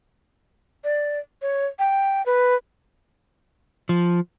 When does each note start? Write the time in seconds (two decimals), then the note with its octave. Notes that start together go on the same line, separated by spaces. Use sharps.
0.84 D5
1.42 C#5
1.79 G5
2.26 B4
3.89 F3